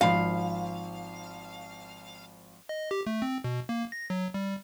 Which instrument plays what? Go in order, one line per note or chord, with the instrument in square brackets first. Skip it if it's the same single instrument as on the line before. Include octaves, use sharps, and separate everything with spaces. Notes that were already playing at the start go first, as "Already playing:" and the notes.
[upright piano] G#1 F3 B5 [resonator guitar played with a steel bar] F5
[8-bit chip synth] D#5
G4
A3
C4
B2
A#3
A#6
F#3
G3